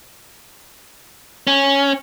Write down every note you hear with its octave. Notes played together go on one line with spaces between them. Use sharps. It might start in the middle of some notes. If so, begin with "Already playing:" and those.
C#4